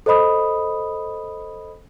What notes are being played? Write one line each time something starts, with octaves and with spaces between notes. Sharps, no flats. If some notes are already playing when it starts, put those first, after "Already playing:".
A4 C5 D#5 B5 D#6